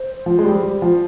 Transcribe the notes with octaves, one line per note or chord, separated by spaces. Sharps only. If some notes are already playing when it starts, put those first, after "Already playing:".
Already playing: C5
F3
G#3
G3
G3
F3